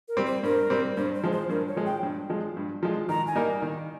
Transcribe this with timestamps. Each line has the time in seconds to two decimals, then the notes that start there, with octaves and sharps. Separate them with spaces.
0.08 A#4
0.17 G3 C4
0.26 C5
0.43 G2 A#4
0.70 G3 C4
0.97 G2 C5
1.14 C5
1.24 F3 G#3
1.32 C5
1.49 G2 A#4
1.68 C#5
1.77 F3 G#3
1.85 G5
2.03 G2
2.30 F3 G#3
2.57 G2
2.83 F3 G#3
3.09 D#3 A#5
3.27 G#5
3.35 G3 A#3 D#4 A#4
3.62 D#3